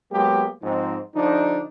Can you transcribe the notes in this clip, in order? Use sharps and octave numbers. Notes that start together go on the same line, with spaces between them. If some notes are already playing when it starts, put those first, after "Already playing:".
F#3 G#3 A#3 B3 G4
G#2 F3 C4 D#4
D3 F3 D4 D#4